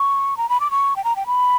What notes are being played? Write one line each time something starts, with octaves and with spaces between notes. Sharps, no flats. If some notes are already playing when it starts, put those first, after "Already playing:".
Already playing: C#6
A#5
B5
D6
C#6
G5
A#5
G5
B5